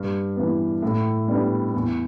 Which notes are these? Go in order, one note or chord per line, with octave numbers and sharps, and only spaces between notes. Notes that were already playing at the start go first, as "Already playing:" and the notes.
Already playing: G2
E3 B3
A2
G3 B3 D4
E2